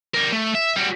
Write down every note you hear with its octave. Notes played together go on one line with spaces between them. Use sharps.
G3 A#4
A3
E5
G3 F#4